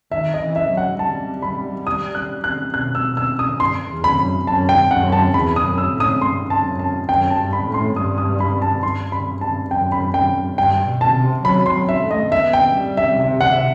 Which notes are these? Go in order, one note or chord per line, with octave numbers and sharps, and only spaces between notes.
D#3 E5
D#5
E3
E5
F#3
F#5
G3 A5
B5
D#6
F#6
F#6
B2 F#6
E6
E6
D#6
G2 C6
E2
B5
F#2
F#2 A5
G5
F#2 F#5
A5
E2 B5
D#6
F#2
E6
A2
D#6
G2 C6
A5
F#2
A5
F#2 G5
A5
G2
B5
A2
C6
G2 D#6
D#6
B5
A5
G2 C6
B5
A5
F#2 G5
B5
G5
G2 G5
B2
A5
C3
F#3 B5
C6
F#3
E5
A3
D#5
B3 E5
G5
G3
E5
C3 E5
F#5
E5